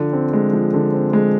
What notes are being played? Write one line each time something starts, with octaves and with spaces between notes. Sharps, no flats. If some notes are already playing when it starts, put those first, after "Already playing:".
Already playing: D3 F3
C4
G#3
F3
D3
C4
G#3